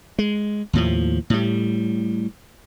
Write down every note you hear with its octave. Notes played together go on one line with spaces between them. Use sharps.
G#3
D#2 A2 F3
A2 G3